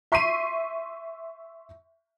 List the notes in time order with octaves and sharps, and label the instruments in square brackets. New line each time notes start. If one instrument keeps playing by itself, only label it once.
[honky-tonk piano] E5 C6 C#6 B6 C7 D#7